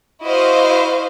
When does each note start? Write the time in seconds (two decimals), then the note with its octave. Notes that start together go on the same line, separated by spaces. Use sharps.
0.24 E4 F#4 C5 D#5 F5